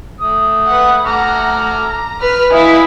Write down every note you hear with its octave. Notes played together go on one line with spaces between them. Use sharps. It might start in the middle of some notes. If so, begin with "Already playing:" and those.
A3 D#6
B4 F#5
A4 F#5 A#5 D6 F6
A#5
B4 F6
E4 B4 D#5 F5 G#5